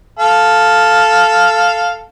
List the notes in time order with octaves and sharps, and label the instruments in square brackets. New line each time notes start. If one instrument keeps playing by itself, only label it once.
[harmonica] A4 F5